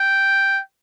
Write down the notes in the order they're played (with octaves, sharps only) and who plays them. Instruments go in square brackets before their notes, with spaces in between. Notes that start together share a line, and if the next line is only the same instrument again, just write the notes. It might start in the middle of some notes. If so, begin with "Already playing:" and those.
Already playing: [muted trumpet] G5